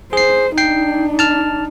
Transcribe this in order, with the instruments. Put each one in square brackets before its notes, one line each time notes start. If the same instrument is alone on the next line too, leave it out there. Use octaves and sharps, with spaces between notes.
[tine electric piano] G#4 C7 [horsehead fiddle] C5
[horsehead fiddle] D4 D#4 [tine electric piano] G5 C7
[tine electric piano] A5 F6